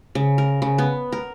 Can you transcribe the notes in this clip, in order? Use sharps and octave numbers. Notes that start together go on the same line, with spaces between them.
C#3
A#4
C#3
B3
A#4